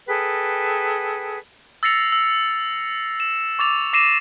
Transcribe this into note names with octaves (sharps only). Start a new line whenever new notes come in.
G#4 A4 B4 G5
E6 A6 A#6 C7 C#7 F7
E6
E7
C#6 D6 A6 F7
D6 A#6 C7 D#7 E7